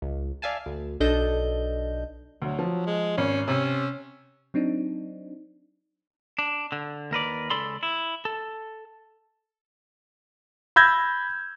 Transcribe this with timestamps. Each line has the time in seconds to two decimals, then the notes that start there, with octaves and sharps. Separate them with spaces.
0.02 C#2
0.42 D5 E5 F5 G#5 A5
0.66 D2
1.00 B1 D4 A4 D#5 G6
2.42 D2 F#3
2.59 F3
2.87 G#3
3.18 G#1 C#4
3.48 C3 C#4
4.54 F#3 C4 D4 D#4
6.39 D4
6.72 D3
7.11 D#2 A#4 B4 D5
7.50 C#2 C#3 A4 D5 B5 C6
7.83 E4
8.25 A4
10.76 B5 E6 G6 G#6 A#6